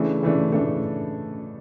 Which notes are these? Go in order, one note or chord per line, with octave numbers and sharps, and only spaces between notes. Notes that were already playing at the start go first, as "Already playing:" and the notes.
Already playing: C#3 E3 A3 D4 A4
C#3 E3 A3 D4
C#3 E3 A3 D4 A4